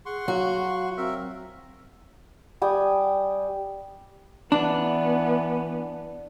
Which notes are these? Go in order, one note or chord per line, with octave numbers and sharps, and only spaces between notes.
G#4 F#5 C6 C#6
F#3 F#4 F5
C4 A#4 E5
G3 G5 G#5 D#6
E3 B3 D4